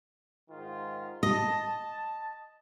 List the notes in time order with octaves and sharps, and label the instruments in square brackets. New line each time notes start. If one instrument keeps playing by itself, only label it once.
[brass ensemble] G#2 D#3 F4
[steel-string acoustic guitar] D#5 [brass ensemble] A5